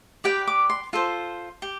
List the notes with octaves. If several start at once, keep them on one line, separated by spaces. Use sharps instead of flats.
G4 B4 D5 G5
D6
C6
F4 A4 C5
G4